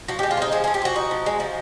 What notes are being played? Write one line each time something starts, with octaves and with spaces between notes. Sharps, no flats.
F3 F#4
G4
G#3
F4
C4 D#4
F3 G#4
G#4
F3
G4
C4 F#4
D#4
F3
G#3
F3